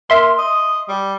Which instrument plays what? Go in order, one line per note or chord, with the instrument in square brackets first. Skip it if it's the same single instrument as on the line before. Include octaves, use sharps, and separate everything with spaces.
[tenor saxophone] A#3 [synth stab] E5 C6
[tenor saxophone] D#5
G3